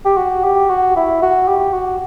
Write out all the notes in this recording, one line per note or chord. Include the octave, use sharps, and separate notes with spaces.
G4
F#4
G4
F#4
E4
F#4
G4
F#4